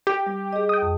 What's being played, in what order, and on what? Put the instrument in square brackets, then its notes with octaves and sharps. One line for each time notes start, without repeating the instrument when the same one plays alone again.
[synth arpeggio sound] G4
[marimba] G3
G#4 D#5
[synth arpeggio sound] G5 D#6
[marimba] F2